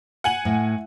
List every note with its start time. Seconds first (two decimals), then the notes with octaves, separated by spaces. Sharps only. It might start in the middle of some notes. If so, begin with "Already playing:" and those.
0.24 F#5 G#5 F#7
0.45 A2